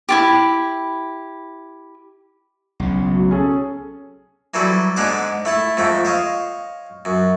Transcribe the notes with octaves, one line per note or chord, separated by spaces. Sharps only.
E4 F4 G4
B1 C#3
F#3
C#4 G#4 A4
E3 F#3 G3 A4 C5
G#2 D3 G#3 C5 F#5 D6
A3 E4 A5
F2 G#2 A3 G5
C5 C#5 D#5 F5
F#2